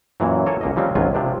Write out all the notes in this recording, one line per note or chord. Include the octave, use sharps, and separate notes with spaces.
F#2 A#2 E3 F#3
A#3 A4 A#4 C#5 G#5 A5
C#2 A#3 D#5
C#3 F3 G3 G#3 C4 C#4
G#1 C#2 F#3 F4 G#5
C3 F3 D4